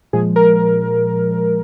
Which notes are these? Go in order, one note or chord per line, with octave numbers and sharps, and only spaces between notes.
A#2 F3 G#3 G#4
A#4